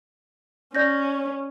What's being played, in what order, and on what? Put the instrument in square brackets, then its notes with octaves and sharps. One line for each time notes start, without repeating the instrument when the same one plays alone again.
[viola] C#4 [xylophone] D5 G6 A#6